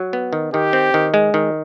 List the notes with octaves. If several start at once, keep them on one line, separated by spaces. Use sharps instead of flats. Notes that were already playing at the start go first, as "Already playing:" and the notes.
Already playing: F#3
B3
D#3
D#3 G4
C4
D#3
G#3
D#3